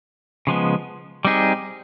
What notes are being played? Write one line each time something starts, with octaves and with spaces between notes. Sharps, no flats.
C#3 F3 G#3 B3
G3 C4 D#4 G#4